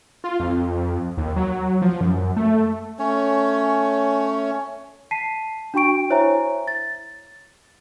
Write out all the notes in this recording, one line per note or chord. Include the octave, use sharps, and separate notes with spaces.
F4
F2
D#2
F#3
F3
F#2
A3
A3 C#4 C#5
A5 B6 C7 D#7
D4 F#4 G5 C#6 D7
E4 C5 C#5 E5 G#5 A#5
A6